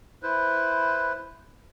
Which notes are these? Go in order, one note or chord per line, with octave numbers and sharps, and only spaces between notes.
E4 B4 C5